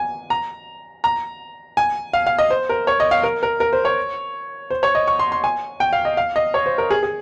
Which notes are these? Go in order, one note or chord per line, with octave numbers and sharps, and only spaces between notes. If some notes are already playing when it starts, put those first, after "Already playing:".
Already playing: G#5
A#5
A#5
G#5
F5
F5
D#5
C5
A#4
C#5
D#5
F5
A#4
A#4
A#4
C5
C#5
C5
C#5
D#5
C#6
C6
C6
G#5
G5
F5
D#5
F5
D#5
C#5
C5
A#4
G#4
G#4